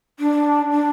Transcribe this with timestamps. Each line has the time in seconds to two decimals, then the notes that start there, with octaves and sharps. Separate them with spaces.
0.19 D4
0.71 D4